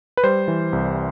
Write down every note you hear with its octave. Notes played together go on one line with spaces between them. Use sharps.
B4
G3 C5
E3
C2